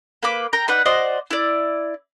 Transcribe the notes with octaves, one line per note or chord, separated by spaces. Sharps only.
A#3 B4 B5 D6
A#4 G5 A#5
D#4 B4 D5 F#5
F#4 C5 D5 D#5
E4 D5